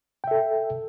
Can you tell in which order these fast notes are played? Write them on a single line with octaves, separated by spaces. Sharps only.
G5 E5 A4